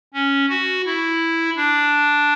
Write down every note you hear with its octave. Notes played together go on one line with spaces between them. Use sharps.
C#4
F#4
E4
D4